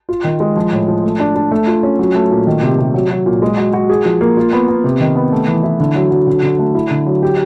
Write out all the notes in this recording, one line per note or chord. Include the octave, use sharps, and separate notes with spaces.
F4
D#3
G#3
F3
A2
F3
A3
D4
D4
A3
F4
C#4
F#3
A3
A#2
D#3
C3
C3
F#3
F#3
A#2
G#3
F#4
F#4
G#4
F3
A#3
F4
B3
B3
C3
D#3
B3
A3
E3
E4
D3
F#3
F#3
D3
D3
A3
E4
D3
F#3
G4